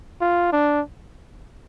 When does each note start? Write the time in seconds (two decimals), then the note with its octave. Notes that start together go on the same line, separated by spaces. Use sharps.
0.21 F4
0.53 D4